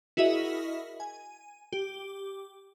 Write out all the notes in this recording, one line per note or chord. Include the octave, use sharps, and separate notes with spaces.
E4 F#4 G#4 A#4 D#5 E5
G#5
G4